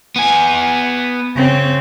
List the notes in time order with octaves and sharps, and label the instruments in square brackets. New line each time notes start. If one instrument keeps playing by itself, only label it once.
[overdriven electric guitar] B3 G#5
[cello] C#3 C4